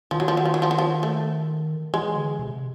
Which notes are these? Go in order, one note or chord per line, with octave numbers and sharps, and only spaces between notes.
D#3 F3
F#3
F3
F#3
F3
F#3
F3
F#3
F3
A3
E3 G#3
D3
C3